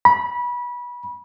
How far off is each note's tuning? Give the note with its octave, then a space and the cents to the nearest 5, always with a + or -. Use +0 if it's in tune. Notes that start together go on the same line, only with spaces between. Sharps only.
B5 -25